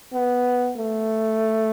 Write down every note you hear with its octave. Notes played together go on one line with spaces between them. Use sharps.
B3
A3